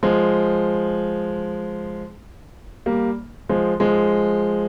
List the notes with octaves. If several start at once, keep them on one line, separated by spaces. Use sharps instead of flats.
F3 G#3
G3 A#3
F3 G#3
F3 G#3